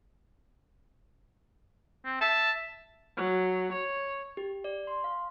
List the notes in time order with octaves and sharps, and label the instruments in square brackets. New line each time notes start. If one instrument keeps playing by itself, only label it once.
[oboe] C4
[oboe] E5 [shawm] A5
[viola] F#3
C#5
[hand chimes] G4
D5
C6
F5